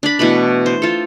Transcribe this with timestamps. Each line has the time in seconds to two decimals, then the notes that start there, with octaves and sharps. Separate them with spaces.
0.03 D4 D5 B5
0.19 B2 E3 A3 B5
0.66 C5
0.82 F4 A4